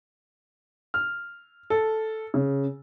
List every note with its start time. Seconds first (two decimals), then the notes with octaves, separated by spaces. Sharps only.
0.94 F6
1.70 A4
2.34 C#3